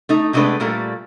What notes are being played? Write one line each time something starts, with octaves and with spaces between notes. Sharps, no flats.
A3 D#4
C3 G#3 A3 B3 D4 B4
A#2 G3 A3 A#3